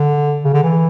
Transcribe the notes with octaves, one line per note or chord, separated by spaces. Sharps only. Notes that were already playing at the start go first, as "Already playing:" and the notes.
Already playing: D3
C#3
D3
E3